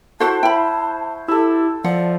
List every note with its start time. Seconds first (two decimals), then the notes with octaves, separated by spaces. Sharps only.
0.20 E4 F#4 A4 C5 F#5 A5 C#6
0.43 E4 G5 B5
1.28 E4 G4 A4 E6
1.84 F3 D5 F#5